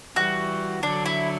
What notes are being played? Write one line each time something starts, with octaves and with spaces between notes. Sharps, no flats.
E3 G3 F#4
D3 F#3 D4
E4